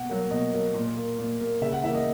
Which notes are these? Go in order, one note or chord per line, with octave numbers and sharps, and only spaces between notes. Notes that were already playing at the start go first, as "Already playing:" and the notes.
Already playing: B2 F#5
F#3 A#3
B2 D#5
F#3 A#3
A#2
A#3
A#2
A#3
C#3 E5
F#5
E3 A#3 E5
D#5